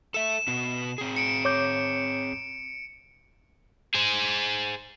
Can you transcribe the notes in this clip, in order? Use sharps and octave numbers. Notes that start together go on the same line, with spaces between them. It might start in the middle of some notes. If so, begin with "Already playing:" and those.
A4 E5 E7
B2 B3
C4 G#4
C#7 D7
C#5 D6 G6
G#4 C5